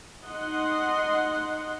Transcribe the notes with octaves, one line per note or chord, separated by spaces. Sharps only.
D#4 D#5 F#5 C6